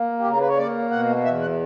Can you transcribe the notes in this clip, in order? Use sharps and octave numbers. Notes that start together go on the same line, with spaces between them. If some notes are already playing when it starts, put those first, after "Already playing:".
Already playing: A#3
G4
C#3 A#4
B4
C#5
A#3 D5
B2 F#5
E2 E5
F#5